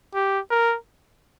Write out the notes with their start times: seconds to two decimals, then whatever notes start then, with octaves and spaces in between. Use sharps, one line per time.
0.14 G4
0.50 A#4